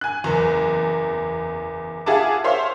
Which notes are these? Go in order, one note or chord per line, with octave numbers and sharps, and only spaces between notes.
G#5 F#6
F#1 E2
F4 G#4 E5 F#5 A5 D6
C5 C#5 E5 F5 C6